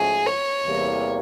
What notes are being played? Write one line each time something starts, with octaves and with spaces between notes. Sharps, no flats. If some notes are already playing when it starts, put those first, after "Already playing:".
Already playing: G#2 F3 A3 C#4 F#4 G#4
C#5
E2 C3 E3 G3 A#3